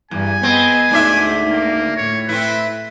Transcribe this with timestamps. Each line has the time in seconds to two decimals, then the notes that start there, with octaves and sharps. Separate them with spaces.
0.11 E2 G2 G#5
0.43 B3 C4 G#4 D#5
0.91 D2 G#2 D4 E5
1.46 A#3
1.97 A2 C#5
2.29 C4 E4 B4